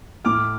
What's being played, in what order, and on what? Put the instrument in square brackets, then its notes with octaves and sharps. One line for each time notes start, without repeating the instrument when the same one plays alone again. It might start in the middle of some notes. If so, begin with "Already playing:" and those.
[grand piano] A2 D6 F6